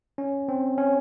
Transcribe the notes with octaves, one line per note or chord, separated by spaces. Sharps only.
C#4
C4
C#4